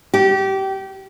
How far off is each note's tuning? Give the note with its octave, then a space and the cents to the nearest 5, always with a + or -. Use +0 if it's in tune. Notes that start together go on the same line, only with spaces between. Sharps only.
G4 -25